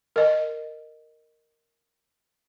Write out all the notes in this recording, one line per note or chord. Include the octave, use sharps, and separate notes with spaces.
A#4 D#5